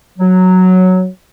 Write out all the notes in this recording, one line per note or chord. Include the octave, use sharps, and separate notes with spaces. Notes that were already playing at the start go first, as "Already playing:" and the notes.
F#3